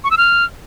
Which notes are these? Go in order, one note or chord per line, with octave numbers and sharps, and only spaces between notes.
C#6
E6
F6